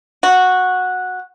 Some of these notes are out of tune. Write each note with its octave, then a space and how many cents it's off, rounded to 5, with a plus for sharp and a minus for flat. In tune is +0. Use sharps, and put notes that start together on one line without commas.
F#4 -10